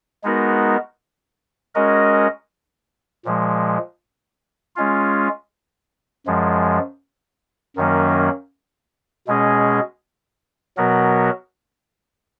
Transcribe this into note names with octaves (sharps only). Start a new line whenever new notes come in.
G#3 B3 D#4 F#4 A#4
G#3 C#4 F#4 A#4 D#5
A#2 F3 G#3
G#3 C#4 F4
F#2 F3 G#3
F#2 D#3 F#3 A#3 C#4
B2 G#3 C#4 G#4 D#5
B2 F#3 B3 F#4 A#4